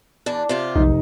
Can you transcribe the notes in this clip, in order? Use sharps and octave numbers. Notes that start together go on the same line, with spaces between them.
E2 D4
C3 F4 G4
F1 B1 D#4